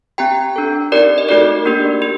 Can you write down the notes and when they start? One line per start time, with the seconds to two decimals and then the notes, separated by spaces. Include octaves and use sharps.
0.18 C4 G4 G5 A#5
0.56 D4 A4
0.92 C4 D#4 G4 A#4 D5
1.18 D#5
1.29 A3 D#4 F#4 A4 A#4 D5
1.65 A#3 D4 G4
2.02 G4